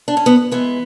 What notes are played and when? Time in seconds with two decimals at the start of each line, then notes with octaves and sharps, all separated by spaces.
0.08 D4
0.17 C#4
0.26 F#2 B3
0.51 E3 G#3 B3